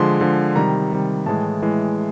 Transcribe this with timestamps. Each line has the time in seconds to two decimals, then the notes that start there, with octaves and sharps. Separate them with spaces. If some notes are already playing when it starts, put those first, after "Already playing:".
Already playing: D3 F3 G#3 C6
0.21 D3 F3 G#3
0.56 C3 D#3 G3 A#5
0.92 C3 D#3 G3
1.26 A2 E3 G#3 A5
1.62 A2 E3 G#3